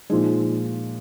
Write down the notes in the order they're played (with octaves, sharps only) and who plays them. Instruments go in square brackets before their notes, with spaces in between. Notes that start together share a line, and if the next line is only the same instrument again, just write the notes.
[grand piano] A#2 F3 G#3 [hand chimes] D#4